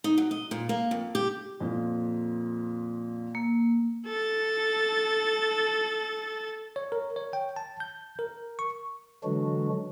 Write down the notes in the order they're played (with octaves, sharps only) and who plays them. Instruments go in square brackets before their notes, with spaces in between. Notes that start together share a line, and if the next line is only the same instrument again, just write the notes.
[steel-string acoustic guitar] D#4
F#3
D#5
A#2
A#3
F2
G4
[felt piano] F2 A#2
[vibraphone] A#3
[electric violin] A4 A6
[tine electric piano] C#5
A#4
C#5
G5
A5
G6
A#4
C#6
[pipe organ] D3 E3 F#3 G#3 D4 F#4